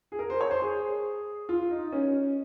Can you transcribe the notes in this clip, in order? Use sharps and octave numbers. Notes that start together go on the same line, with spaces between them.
G#4
A#4
C5
C#5
C5
G#4
F4
D#4
D#4
C#4